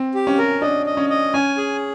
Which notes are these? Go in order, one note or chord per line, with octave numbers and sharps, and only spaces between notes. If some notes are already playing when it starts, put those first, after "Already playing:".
Already playing: C4
G4
C#4
A#4
D4 D#5
D#5
C#4
D#5
C#4 G#5
G#4